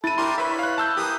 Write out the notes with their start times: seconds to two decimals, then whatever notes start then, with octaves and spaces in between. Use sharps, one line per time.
0.04 E4 A4 A6 D#7
0.18 D4 G4 A#4 C6
0.38 B4 C#5 E5 B5
0.59 F5 F#6
0.78 A5 E6 G6
0.97 E3 A#3 G4 D#6